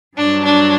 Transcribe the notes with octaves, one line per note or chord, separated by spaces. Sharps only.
G2 F#3 D4
D4